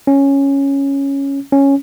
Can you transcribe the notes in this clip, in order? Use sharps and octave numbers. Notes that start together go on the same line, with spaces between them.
C#4
C#4